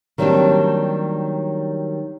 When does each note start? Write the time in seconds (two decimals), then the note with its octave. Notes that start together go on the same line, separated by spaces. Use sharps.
0.18 D#3 F#3 G3 A#3 C4 D4